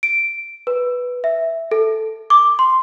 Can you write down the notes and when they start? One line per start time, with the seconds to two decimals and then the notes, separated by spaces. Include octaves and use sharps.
0.03 D7
0.67 B4
1.24 E5
1.71 A4
2.30 D6
2.59 C6